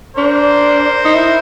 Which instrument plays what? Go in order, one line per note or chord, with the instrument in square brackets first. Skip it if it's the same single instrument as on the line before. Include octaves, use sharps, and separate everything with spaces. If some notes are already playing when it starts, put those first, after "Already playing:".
[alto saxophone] D4 [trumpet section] A#4 C5
[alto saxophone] D#4
E4